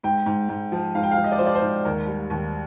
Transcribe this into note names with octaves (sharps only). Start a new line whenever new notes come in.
G#2 G5
G#2
G#2
F3
G#2 F5
G5
F5
F3
D#5
D5
F3 C5
D5
C5
G#2
D#2 A#4
G3
D#2